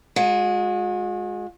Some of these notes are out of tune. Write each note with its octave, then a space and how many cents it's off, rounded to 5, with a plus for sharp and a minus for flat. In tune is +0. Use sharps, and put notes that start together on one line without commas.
G#3 +0 F#4 -45